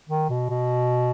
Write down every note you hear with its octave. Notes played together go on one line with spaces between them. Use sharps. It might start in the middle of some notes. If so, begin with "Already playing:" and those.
D#3
B2
B2